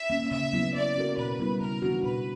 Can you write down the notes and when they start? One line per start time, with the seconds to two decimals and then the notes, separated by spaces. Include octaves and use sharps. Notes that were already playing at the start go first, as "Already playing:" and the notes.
Already playing: E5
0.10 A#3 C#4
0.31 C#3 E5
0.53 F#3 B3 E4
0.74 F#3 D5
0.96 C#4 F#4 A#4
1.17 B2 B4
1.39 G3 B3 E4
1.61 C#3 A#4
1.82 E3 B3 D4 F#4
2.04 B2 B4